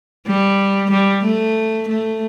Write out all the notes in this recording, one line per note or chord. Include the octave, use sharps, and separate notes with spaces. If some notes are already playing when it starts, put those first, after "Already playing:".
G3
G3
A3
A3